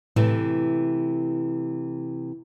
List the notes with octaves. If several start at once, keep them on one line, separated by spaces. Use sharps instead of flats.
A2 C3 E3 A3